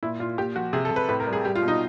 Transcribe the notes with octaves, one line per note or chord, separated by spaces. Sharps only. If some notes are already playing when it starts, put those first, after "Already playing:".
A#2 E4
A#2 F4
A#2 G4
F3 F#4
C3 G#4
A4
C3
B4
A2 B4
A#4
G3
G#4
G3 G4
F4
B2
D#4